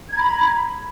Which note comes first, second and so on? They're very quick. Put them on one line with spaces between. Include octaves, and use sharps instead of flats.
G#6 A#5 B5